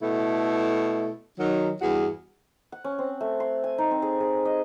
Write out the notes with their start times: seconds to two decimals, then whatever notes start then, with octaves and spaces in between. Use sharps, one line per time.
0.02 B2 A3 E4 A4
1.39 D#3 F#3
1.82 E2 G2 F#4 G#4
2.72 F#5
2.84 C#4
2.99 C4
3.21 A3
3.40 C6
3.64 G#5
3.78 D#4
3.91 C4
4.02 G#4
4.20 G#4
4.45 D#5